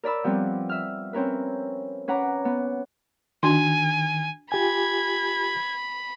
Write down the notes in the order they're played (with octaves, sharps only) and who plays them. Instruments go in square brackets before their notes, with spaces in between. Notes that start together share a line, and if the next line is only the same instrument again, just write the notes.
[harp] A#4 D5 B5 E6
F3 G3 B3 C4
E5 F6
C4 C#4 A#4 B4
C#4 B4 F#5 A#5 D6
B3
[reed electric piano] D#3 [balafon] D4 F#4 C6 [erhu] G#5
[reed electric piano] F4 G4 G#5 [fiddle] B5 [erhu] G#6